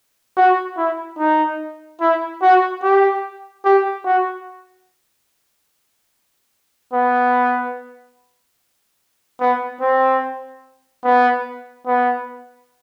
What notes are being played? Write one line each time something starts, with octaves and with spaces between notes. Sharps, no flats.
F#4
E4
D#4
E4
F#4
G4
G4
F#4
B3
B3
C4
B3
B3